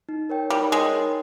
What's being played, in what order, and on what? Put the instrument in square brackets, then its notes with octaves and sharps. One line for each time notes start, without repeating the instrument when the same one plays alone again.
[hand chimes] D#4
A#4 C#5 G5
[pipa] G3 [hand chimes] D#4
[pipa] G#3 [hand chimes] A#4 C#5 G5
[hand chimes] D#4